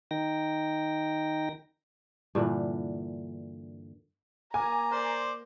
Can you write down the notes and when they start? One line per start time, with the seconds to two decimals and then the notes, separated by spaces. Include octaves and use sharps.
0.11 D#3 D#4 G5 A#6
2.35 G2 A#2 D3 E3
4.54 A#3 G#5 A#5
4.91 A#4 C5 D5